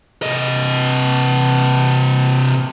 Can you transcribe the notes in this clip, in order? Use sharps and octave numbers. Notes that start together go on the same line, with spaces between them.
C3 D#5